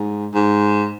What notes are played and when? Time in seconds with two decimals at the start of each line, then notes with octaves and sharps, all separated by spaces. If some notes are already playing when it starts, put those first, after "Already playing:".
Already playing: G#2
0.34 G#2